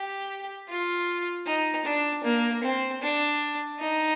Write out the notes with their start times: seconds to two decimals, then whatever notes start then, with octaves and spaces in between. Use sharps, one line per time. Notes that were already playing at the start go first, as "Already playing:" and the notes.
Already playing: G4
0.69 F4
1.47 D#4
1.85 D4
2.24 A#3
2.63 C4
3.02 D4
3.79 D#4